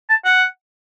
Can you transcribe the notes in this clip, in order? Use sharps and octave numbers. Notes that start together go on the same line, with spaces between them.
A5
F#5